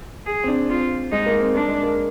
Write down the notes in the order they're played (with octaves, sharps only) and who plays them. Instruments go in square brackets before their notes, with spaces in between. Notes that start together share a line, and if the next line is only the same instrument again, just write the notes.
[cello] G#4
[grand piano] C4
D4
[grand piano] C4 [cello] F4
[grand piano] G#3 [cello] D#4
[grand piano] A#3
C4
[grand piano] A#3 [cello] D4
[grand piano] G#3
A#3